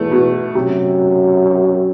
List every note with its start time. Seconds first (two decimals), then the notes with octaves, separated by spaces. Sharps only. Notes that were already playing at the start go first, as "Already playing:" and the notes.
Already playing: E2 A3
0.11 B2
0.55 F#2 C3